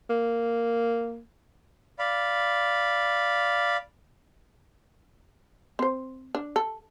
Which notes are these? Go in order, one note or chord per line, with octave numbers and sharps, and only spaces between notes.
A#3
D5 F5 B5
C4 C5
D4
A4